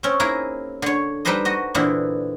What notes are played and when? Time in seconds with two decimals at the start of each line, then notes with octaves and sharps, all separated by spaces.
0.03 C4 C#4
0.20 A#3 D#4 E4 G#4 A#4
0.82 D3 C#5
1.25 G3 D#4 A4 B4 C5 D#5
1.45 F#4 D#5
1.75 A#2 D3 E3 B3 C4 D4